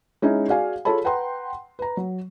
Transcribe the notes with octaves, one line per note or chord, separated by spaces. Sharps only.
G#3 C#4 D#4 E4
F#4 G#4 D5 F5 G#5
F4 G#4 A4 C#5 A5 B5
B4 F#5 G5 A#5 C6
B4 A#5
F#3